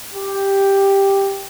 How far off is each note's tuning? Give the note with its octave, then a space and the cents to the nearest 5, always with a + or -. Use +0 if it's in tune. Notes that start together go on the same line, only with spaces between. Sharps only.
G4 +5